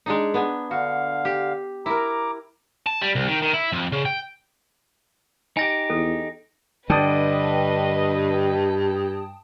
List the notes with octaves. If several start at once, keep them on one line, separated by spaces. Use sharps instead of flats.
G#3 D4 D#4
B3 D4 G#5
D3 F#4 F5
G4
E4 A#4 A#5 D6
A5
G3
C2
D#3
D#3
E4
F2
C#3
G5
D#4 G4 G#5 A#6
E2 A4
G2 D3 B4 D#5 G5 A5 D#6